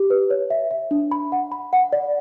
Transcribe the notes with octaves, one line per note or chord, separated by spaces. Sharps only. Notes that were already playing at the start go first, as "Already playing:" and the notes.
Already playing: G4
B4
C#5
E5
E5
D4
B5
F#5
B5
F#5
D5